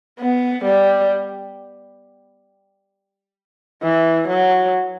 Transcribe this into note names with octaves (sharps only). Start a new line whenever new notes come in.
B3
G3
E3
F#3